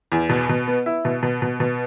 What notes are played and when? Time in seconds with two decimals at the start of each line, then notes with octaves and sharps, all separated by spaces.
0.12 E2
0.29 B2
0.49 B2
0.68 B3
0.86 E4
1.05 B2
1.23 B2
1.42 B2
1.60 B2